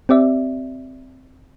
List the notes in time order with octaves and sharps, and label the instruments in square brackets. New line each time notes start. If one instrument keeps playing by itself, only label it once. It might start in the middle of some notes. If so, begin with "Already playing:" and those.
[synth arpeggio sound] C4 G4 D5 E5